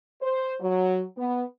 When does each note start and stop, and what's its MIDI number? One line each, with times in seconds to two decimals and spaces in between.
0.22 0.54 72
0.60 1.03 54
1.16 1.44 59